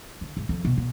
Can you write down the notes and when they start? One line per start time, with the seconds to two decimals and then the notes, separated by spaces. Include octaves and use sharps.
0.21 D3
0.37 G#2
0.49 F2
0.65 B2
0.77 B2